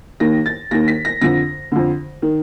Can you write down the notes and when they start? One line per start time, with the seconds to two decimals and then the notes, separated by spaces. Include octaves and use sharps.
0.20 D#2 D#3 A#6
0.46 A6
0.71 D#2 D#3 A#6
0.88 B6
1.05 A#6
1.21 F2 D3 A#6
1.72 F2 D3
2.22 D#3